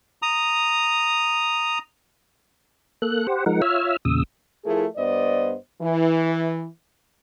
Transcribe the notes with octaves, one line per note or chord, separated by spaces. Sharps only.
A#5 D#6
A#3 A4 F#6
G4 C5 F#5
F3 G#3 D#4 A#4 F#5
F4 C#5 E5 E6 F6
E2 A#2 C#3 D#6 E6
F3 A3 E4 G#4 A#4
G2 B3 C5 D5 D#5
E3